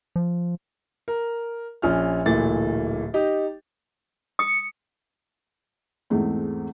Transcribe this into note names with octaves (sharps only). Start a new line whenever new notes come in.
F3
A#4
A#1 C#4 F4 F6
D1 A#2 E3 A3 A6
D#4 G4 D#5
D#6 C#7
E2 G#2 G#3 A3 C4